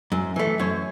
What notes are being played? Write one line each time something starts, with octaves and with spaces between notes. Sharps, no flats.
F#2
E3 A3
F#2 C#5